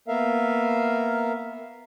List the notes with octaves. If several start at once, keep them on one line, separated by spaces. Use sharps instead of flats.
A#3 B3 A#4 E5 F5